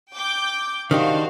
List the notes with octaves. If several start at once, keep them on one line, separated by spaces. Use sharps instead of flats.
G5 D6 G6
D#3 D4 F#4 G4 C5 F5